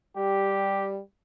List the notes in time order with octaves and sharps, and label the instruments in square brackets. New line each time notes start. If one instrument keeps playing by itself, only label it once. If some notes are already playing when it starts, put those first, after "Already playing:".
[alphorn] G3 [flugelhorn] G4